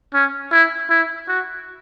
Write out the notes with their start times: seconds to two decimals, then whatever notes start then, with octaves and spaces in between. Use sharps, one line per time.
0.13 C#4
0.52 E4
0.90 E4
1.28 F#4